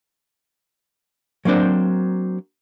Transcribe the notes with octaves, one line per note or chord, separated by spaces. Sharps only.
F#3 A#3 C4 D4 C5